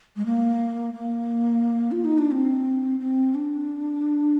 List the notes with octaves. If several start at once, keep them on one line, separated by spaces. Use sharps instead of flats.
G#3
A#3
A#3
F4
D#4
D4
C4
C4
D4